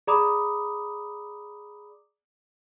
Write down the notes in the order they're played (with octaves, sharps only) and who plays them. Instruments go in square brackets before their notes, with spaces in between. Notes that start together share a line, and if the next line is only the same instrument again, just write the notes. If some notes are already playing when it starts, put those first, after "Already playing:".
[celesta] G#4 D5 A#5 B5 D6 D#6